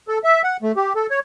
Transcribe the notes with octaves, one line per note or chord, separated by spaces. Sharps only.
A4
E5
F#5
A3
G4
A4
C#5